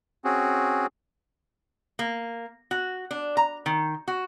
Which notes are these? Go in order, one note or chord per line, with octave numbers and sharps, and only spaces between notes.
C4 C#4 F#4 G#4
A#3
F#4
D4
A#5
D#3
F#4